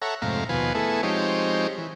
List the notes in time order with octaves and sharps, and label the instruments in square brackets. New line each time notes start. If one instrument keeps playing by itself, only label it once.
[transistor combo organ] A4 C#5 E5 F#5 A#5
F2 G#2 C3 A3 F5 A#5
D#2 B2 F3 B4 F5 G#5
A3 B3 E4 G#4 A4
F3 G#3 C4 D#4 G4 C#5
E3